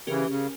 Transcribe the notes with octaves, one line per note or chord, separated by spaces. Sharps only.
C#3 E3 C#4 G4 A#4
C#3